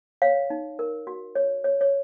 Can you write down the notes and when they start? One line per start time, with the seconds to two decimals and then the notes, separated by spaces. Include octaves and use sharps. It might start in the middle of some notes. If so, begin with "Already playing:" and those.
0.22 C#5 F5
0.50 D#4
0.79 A#4
1.07 F#4
1.35 C#5
1.64 C#5
1.81 C#5